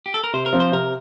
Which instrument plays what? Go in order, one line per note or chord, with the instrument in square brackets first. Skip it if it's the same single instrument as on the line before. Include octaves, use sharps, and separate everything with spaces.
[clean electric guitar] G4
A4
A#4
[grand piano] C3 [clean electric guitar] C5
[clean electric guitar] A#4
[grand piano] F3 C4
[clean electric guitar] C5
[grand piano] C3 [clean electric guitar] A#4